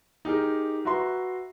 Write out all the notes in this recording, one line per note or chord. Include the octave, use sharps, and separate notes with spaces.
D#4 G4 G#4 A#4
F#4 B4 E5 A#5 C6